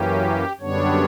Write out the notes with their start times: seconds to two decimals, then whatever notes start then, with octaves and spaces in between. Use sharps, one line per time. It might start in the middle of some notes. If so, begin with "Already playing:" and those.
Already playing: F#2 E3 A#3 C#4 G4
0.60 F#2 D3 G3 B3 D4 C#5